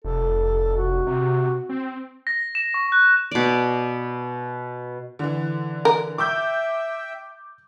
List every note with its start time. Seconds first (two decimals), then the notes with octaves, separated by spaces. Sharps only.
0.04 F1 A4
0.77 F#4
1.07 C3
1.69 C4
2.27 A#6
2.55 E7
2.74 C#6
2.92 F#6
3.31 B2 D5
5.19 D3 E3
5.85 A#4
6.18 E5 G5 D6 E6 G6